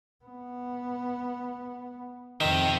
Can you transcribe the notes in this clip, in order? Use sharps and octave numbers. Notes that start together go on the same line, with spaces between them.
B3
F2 D#3 G4 E5